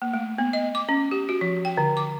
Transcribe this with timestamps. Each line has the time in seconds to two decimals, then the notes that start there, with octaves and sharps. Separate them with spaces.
0.02 A#3
0.13 A3
0.38 B3
0.53 D#5
0.75 D6
0.89 C#4
1.11 G4
1.29 F#4
1.41 F3
1.65 G5
1.77 D3
1.97 D6